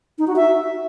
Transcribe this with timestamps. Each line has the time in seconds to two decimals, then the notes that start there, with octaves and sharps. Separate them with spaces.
0.19 D#4
0.27 F#4
0.36 E5